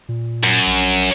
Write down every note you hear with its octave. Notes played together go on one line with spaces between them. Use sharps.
A#2
F#2
A#1